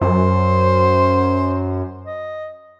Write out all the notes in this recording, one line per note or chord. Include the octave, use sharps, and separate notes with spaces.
F#2 C5
D#5